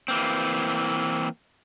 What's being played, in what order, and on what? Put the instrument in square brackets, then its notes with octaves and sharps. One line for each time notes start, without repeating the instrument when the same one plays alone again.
[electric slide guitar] E3 A#3 C4